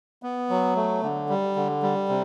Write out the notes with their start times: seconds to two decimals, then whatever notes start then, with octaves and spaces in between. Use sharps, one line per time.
0.23 B3
0.50 F#3
0.76 A3
1.03 D3
1.29 G3
1.56 D3
1.83 G3
2.09 C3